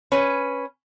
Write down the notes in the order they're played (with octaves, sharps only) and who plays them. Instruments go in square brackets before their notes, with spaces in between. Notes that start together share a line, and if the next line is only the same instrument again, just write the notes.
[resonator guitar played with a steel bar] C#4 B4